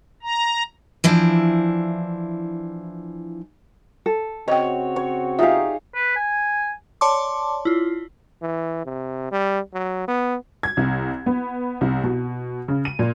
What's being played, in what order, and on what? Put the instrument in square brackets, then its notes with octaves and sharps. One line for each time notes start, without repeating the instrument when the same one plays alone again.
[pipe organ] A#5
[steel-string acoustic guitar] E3 F3 D4 E4
[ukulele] A4
[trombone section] C#3 C4 F#4 [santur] C#5 [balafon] D#5 G5
[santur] C#5
[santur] D#4 G#4 F5 [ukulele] F4 G4 [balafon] E5
[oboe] B4
G#5
[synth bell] C#5 D5 A5 C6 D6
E4 F4
[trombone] E3
C3
G3
F#3
B3
[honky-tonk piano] G#6
C2
B3
C2
B2
C#3
D#7
A#2